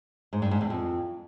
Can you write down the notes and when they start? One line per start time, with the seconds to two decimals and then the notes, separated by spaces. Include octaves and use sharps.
0.33 G#2
0.42 G2
0.51 G#2
0.61 E2
0.70 F2